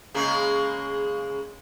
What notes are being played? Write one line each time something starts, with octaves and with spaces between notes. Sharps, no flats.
C#3 G#3 A#3